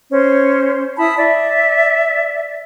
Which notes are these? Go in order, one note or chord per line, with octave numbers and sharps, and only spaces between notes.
C#4 C5
E4 A5 B5 D#6
D5 E5